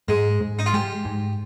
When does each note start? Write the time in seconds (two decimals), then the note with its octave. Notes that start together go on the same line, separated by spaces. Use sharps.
0.08 G#2 G#3
0.41 G#2
0.59 D#4
0.66 F4
0.74 G#3 G4
1.05 G#2